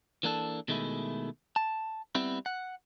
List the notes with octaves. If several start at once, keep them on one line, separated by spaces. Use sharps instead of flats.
E3 A#3 D4 A4
B2 D#3 G#3 A3 E4
A5
G3 B3 C4 E4
F#5